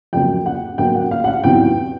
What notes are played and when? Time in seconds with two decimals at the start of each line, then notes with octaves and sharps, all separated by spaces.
0.13 F2 C#3 F#3 A#3 G5
0.46 F#5
0.78 B2 F#3 A#3 G5
0.95 F#5
1.11 F5
1.24 F#5
1.28 F5
1.44 E2 C3 D#3 F#3 B3 G5